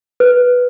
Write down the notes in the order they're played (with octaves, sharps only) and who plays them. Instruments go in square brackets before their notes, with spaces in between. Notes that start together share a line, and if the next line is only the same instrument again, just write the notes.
[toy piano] B4